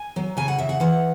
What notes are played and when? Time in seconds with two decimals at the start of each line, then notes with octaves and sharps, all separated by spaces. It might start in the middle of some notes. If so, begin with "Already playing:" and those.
Already playing: G#5
0.16 F#3
0.37 C#3 G#5
0.48 F#5
0.58 C#3 E5
0.69 F#5
0.80 E3 F#5